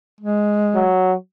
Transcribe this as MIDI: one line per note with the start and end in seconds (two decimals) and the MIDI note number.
0.21 0.89 56
0.75 1.13 54